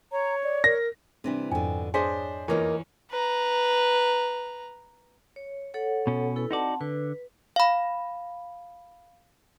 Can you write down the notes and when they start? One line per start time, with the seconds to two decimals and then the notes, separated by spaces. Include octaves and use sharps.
0.12 C#5 A#5
0.44 D5
0.64 A#4 A#6
1.24 C3 E3 G3 C4 D4 A#6
1.51 F2 G#2 B2 D3 F3 C5 G5 G#5
1.94 D4 G#4 C5 C#5 D#5 G#5 C6 B6
2.48 E2 A#3 D#4 F4 A#4 B4 C#5
3.11 B4 A#5
5.36 C#5
5.74 A4 C#5 F#5
6.07 B2 C#4
6.36 E4 A4 B4
6.51 C4 D#4 F#4 D5 F#5 A5
6.81 D3 B4
7.56 F5 B5